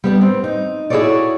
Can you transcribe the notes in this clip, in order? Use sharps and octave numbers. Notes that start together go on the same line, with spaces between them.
G3 B3 D4
C4
D#4
E4 F#4 G#4 A4 C#5 D5